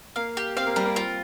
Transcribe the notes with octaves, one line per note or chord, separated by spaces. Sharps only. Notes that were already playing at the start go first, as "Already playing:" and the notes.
A#3 F5
G4
C4 F5
A#3
G3 A#4
A#3
C4 F4